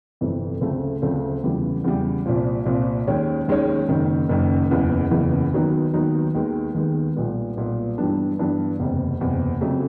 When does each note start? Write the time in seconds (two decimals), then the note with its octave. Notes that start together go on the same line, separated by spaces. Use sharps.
0.21 G1 F2 C3 E3 A3
0.61 D2 C#3 F3 A3 C4
1.02 D2 C#3 F3 A3 C4
1.43 E2 C#3 E3 G3
1.84 E2 C#3 E3 G3
2.26 C2 A#2 F3
2.66 C2 A#2 F3
3.07 D#2 D#3 G#3 C#4
3.48 D#2 D#3 G#3 C#4
3.89 F#1 F#2 D#3
4.29 F#1 F#2 D#3
4.70 F#1 E2 C#3 E3
5.11 F#1 E2 C#3 E3
5.53 D#2 D#3 F#3 B3 D#4
5.94 D#2 D#3 F#3 B3 D#4
6.35 D#2 D#3 G#3 B3
6.75 D#2 D#3 G#3 B3
7.16 B1 A#2 G3 B3
7.57 B1 A#2 G3 B3
7.98 G2 E3 G3 B3 D4
8.39 G2 E3 G3 B3 D4
8.80 F#1 E2 C3
9.20 F#1 E2 C3
9.61 F2 C#3 F#3 A3